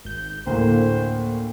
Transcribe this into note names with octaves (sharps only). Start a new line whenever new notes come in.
G#1 G6
D2 A2 A#3 C5